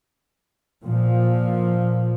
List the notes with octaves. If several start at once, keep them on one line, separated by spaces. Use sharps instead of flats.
A#2 F3